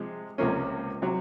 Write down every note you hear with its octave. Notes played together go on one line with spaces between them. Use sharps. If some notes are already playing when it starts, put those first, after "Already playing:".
Already playing: C3 F3 G#3
C#2 C3 F3 A#3 C#4
C3 F#3